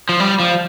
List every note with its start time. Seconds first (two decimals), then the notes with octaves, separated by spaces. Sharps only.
0.09 F3
0.20 G3
0.40 F3